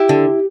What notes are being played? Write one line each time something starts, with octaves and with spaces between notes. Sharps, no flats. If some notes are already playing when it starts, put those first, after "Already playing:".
Already playing: E4 G4
D3